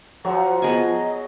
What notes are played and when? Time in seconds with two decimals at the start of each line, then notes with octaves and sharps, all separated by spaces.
0.25 F3 F#3 F#5
0.62 B3 G#4 D#5 G#5